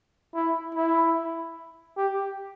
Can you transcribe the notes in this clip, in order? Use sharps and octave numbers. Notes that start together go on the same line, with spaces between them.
E4
E4
G4